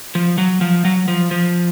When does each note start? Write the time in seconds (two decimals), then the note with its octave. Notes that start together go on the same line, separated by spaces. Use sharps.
0.15 F3
0.38 F#3
0.61 F3
0.85 F#3
1.08 F3
1.31 F3